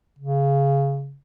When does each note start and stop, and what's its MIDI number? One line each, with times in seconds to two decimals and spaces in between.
0.19 1.17 49